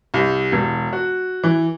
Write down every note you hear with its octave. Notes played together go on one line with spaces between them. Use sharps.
C2
E1
F#4
E3